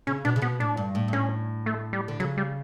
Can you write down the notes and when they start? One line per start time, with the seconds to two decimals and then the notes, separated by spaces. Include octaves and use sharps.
0.07 C#3 C#4
0.25 B2 D4
0.36 C#3
0.42 B2 B3
0.60 A2 D4
0.77 G2
0.95 A2
1.08 G2
1.13 A2 C#4
1.66 A3
1.93 G3
2.08 D3
2.20 C#3 F#3
2.37 G3